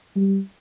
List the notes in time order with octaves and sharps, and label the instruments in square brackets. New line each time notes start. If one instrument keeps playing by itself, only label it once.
[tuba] G3